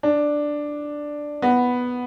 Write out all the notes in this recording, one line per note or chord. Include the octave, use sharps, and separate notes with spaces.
D4
B3